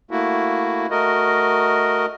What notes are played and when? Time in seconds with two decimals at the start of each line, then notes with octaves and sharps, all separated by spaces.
0.11 A3 A#3 E4 F#4
0.91 A3 F#4 A#4 D#5